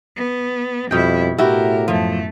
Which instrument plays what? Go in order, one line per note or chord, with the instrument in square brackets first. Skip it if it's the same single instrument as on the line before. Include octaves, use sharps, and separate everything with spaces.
[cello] B3
[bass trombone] F2 [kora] B2 G5 [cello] G3 E4
[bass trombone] A2 [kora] E4 [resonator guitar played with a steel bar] F#4 G4 [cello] A#4
[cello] F#2 A3 [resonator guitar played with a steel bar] F3